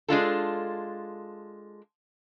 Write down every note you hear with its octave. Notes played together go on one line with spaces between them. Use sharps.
G#3 D4 F4 A4